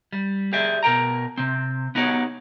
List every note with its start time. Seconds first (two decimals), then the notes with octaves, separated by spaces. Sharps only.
0.13 G3
0.53 G4 G#4 D5 E5
0.83 B2 A#4 G5 A#5
1.38 C3 C4
1.95 B3 D#4 F#4 G4 A#4 C#5